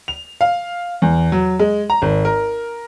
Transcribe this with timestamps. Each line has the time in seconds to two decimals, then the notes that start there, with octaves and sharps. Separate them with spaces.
0.08 F7
0.41 F5
1.02 E2
1.32 F#3
1.59 G#3
1.90 A#5
2.02 G#1
2.25 A#4